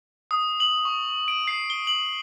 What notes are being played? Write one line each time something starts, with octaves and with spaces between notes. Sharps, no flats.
D#6
F#7
C#6
D7
C7
G7
F#7